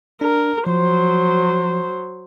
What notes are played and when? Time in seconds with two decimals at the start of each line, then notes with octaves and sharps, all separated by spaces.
0.21 D4 A#4
0.67 F3 F#3 C5